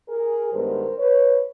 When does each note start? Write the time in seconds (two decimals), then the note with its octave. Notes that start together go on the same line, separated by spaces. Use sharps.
0.08 G#4 A#4
0.53 G2 D#3 G#3 B3 A#4 C5
0.98 B4 C#5